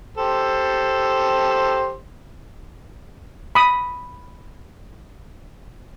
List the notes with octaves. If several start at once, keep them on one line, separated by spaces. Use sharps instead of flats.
G4 A4 C5
B5 D#6